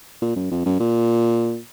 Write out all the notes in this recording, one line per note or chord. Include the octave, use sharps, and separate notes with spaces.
A#2
F#2
F2
F#2
A#2